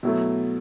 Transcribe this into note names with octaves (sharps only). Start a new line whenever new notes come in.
B2 F#3 A3 E4